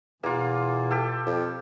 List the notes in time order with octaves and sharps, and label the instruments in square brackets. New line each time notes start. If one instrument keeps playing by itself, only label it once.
[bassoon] E2 [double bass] B2 [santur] A#3 F4
[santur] G4 A4
[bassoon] F2